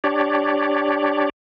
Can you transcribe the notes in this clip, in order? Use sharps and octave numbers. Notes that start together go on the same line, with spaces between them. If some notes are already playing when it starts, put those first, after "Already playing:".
D4 G4 C#5 D5